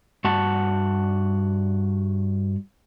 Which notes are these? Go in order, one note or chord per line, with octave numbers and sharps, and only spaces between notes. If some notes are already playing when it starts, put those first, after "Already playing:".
G2 F#4 F#5 A5